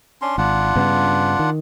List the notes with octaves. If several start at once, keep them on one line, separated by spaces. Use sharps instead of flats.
C#4 D4 C6
G#1 D4 F4 F#5
G2 C#3 B3
D#3